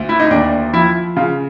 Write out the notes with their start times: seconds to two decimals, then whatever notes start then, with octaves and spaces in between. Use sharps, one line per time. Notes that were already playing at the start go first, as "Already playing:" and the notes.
Already playing: D2
0.09 E4
0.20 D#4
0.31 D#2 D4
0.73 F3 E4
1.16 C#3 F4